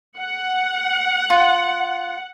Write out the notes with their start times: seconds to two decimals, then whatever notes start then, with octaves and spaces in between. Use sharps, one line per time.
0.19 F#5
1.30 F4